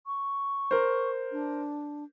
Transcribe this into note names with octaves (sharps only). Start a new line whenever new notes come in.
C#6
A#4 C5
D4